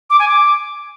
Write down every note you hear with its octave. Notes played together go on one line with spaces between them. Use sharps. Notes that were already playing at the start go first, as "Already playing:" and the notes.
D6
G#5
D6